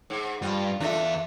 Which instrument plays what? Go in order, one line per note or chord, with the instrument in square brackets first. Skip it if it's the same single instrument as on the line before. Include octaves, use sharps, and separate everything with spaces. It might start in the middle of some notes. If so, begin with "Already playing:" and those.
[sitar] G#2
[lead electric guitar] G2 [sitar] F4
[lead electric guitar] E2 E5 [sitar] D4 F4 A4